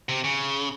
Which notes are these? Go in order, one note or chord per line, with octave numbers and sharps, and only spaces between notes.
C3
C#3